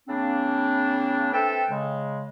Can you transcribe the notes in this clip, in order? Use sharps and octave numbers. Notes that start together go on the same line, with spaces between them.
C#3 A#3 C4 D4
C4 A4 B4 E5 G5 A5
C#3 G#3